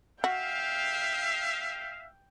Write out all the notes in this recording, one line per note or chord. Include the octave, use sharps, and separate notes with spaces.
F#4 E5 F5 G5